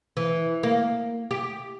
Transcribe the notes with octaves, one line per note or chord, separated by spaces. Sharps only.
E3
A#3
G4